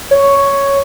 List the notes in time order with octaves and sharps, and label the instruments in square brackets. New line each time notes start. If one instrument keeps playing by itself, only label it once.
[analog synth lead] C#5